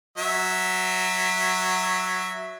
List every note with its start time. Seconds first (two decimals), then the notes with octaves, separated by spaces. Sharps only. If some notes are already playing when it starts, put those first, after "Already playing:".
0.18 F#3 E5